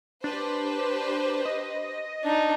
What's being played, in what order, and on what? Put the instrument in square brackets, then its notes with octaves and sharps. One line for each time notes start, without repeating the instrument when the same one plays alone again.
[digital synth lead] D4 [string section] G4 B4 C5
[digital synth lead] D#5
[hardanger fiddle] D4 D#4